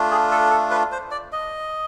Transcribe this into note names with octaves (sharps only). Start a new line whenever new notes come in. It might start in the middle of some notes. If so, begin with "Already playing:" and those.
Already playing: A3 D4 F4
G#4
A4
A4
B4
C5
D5
D#5